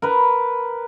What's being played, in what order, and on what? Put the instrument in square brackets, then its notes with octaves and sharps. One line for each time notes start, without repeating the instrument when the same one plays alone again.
[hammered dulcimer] A#4 B4